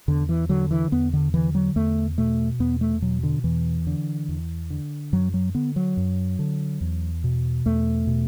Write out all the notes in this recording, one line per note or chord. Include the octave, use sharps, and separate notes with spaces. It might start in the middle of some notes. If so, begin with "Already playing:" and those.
E2 D3
E3
D3 F#3
E3
E2 B3
D3
D3 E3
F#3
E2 A3
B2 A3
E2 B3
A3
B2 F#3
D3
E2 E3
D3
E2
D3
F#2 F#3
F#3
D3 B3
F#3
F#2
D3
E2
B2
E2 A3
B2